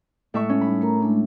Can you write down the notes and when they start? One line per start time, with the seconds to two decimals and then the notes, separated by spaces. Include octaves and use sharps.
0.34 A2 G#3 E5 C#6
0.49 C#4
0.61 G3 D#4 B5
0.81 A3 A#4 A#5
1.01 G#3 A3 D4